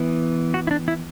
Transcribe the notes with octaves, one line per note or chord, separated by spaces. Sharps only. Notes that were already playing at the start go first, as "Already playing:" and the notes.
Already playing: E3 B3
F#4
E4
D4
E4